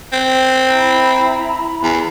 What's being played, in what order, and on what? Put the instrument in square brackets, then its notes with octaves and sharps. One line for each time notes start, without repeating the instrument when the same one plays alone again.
[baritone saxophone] C4
[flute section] E4 A#5 B5
[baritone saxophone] E2